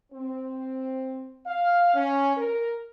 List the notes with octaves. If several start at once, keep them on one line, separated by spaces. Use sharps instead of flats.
C4
F5
C#4
A#4